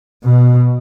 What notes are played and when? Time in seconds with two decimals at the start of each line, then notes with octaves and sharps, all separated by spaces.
0.24 B2